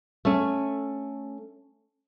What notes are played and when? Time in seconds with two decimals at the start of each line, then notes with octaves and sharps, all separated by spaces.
0.25 A3 C#4